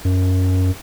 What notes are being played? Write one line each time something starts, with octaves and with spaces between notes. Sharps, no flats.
F#2